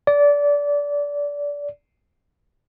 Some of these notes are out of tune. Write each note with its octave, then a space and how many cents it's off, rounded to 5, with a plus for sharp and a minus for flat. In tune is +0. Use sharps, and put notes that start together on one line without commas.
D5 -20